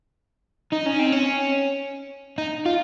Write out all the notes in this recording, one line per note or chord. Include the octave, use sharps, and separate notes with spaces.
D#4
C#4
C4
C#4
D#4
F4